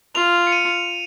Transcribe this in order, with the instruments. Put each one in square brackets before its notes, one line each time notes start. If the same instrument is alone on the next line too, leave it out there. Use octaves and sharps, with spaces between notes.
[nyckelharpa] F4 [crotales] F7
[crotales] C#7
D#7